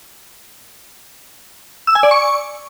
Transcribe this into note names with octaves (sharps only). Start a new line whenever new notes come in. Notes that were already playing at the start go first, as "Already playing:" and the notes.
E6
G#5
D5
C#6